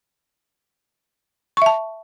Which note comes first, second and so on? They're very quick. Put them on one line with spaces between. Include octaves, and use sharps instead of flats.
C#6 E5 A5